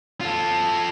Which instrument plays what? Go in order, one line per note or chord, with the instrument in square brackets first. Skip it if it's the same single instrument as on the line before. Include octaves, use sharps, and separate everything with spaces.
[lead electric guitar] F4 A4